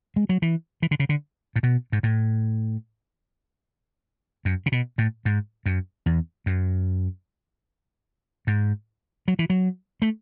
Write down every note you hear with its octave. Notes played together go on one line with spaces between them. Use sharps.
G#3
F#3
E3
E3
D3
C#3
D3
A2
B2
G#2
A2
F#2
C#3
B2
A2
G#2
F#2
E2
F#2
G#2
F#3
E3
F#3
A3